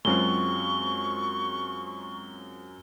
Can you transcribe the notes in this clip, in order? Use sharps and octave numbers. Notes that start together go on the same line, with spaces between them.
F#2 F#3 G#3 C4 F4 C#6 G7